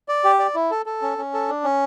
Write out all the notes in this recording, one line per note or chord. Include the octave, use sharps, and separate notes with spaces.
D5
G4
D5
E4
A4
A4
C#4
C#4
A4
D4
C#4